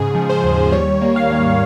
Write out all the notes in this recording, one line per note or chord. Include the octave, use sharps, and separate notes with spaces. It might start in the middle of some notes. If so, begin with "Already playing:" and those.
Already playing: G#2 C#3 G#4
F3
C5
D#2
G3 C#5
A#3
F5
G#2